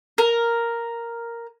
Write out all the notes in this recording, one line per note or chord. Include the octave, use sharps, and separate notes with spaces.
A#4